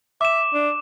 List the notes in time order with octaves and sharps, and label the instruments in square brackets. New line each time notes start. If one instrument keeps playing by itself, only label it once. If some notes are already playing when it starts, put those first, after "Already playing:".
[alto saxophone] E5 [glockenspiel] D6 E7
[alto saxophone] D4